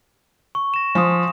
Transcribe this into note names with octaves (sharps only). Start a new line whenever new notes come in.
C#6
A#6 E7
F3 G#5 C6 D#6